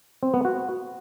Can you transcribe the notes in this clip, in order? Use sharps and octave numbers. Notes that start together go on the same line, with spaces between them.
C4
B3
F#4